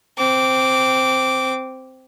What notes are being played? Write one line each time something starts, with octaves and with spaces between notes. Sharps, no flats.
C4 D6